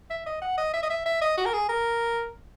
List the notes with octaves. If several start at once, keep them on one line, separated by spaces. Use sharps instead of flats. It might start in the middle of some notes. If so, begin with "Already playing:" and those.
E5
D#5
F#5
D#5
E5
D#5
E5
E5
D#5
F#4
A#4
G#4
A#4